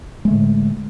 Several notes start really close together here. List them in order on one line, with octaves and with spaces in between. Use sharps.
G#3 A3 D3 A2